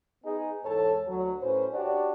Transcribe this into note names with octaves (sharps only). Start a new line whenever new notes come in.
B3 D#4 G#4
E2 G#2 A4 C#5 A5
D2 F#3
A2 C#4 B4 C5
D4 F#4 G4 C#5 D5